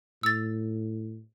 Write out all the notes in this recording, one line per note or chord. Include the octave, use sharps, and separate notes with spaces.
A2 E6 A6